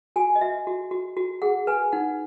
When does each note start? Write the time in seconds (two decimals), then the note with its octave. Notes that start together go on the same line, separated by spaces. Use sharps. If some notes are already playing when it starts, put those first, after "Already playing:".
0.16 F#4 G#5
0.36 D#5
0.41 F#4 E5
0.67 F#4
0.91 F#4
1.17 F#4
1.42 G#4 F#5
1.67 B4 G#5
1.92 D#4 F#5